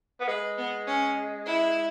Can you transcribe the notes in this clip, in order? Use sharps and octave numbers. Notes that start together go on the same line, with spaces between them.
B3
G#3 B4
B3
C#4
E4